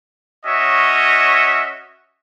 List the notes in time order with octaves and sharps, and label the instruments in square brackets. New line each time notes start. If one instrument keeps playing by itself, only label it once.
[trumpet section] C#4 F#4 C#5 D#5 E5